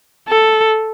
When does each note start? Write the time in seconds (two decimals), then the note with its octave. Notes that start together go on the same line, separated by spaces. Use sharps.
0.29 A4